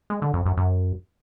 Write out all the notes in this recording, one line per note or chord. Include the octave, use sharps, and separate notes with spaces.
G#3
D3
F2
F#2
F#2